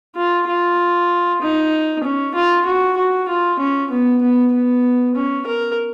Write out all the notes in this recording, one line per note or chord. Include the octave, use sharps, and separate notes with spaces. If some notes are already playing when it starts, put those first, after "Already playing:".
F4
F4
D#4
C#4
F4
F#4
F#4
F4
C#4
B3
B3
B3
C#4
A#4